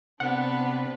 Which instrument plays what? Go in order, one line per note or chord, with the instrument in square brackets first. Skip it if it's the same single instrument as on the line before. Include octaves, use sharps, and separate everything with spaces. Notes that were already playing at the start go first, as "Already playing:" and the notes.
[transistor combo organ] C3 C4 [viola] B3 B4 [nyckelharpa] D4 [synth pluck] F#5